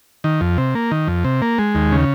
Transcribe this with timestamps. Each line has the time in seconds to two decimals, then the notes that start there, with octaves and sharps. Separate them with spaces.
0.24 D#3
0.41 F2
0.58 C3
0.75 A#3
0.91 D#3
1.07 F2
1.25 C3
1.42 A#3
1.58 G#3
1.75 D#2
1.92 C#3